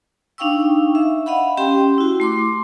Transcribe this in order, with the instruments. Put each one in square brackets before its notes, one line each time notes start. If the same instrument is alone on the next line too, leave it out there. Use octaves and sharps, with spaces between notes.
[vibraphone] D4 D#4 F5 G5 C#6 E6
E5
D#5 F5 F#5 B5
C#4 G4 G5 C6
E4 F#4
A3 C6 D6